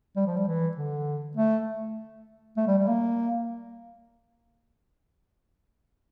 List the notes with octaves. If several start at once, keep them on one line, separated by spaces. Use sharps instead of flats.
G3
F3
G3
E3
D3
A3
A3
G3
G3
A#3